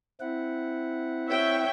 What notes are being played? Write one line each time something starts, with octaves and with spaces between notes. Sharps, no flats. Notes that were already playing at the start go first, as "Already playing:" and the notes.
C4 E4 F#5
C#5 E5 G5